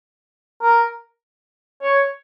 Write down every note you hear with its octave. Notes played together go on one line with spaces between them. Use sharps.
A#4
C#5